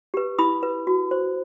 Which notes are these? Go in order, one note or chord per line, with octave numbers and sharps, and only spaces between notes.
G4 B4
E4 B5 D#6
B4
F#4
C5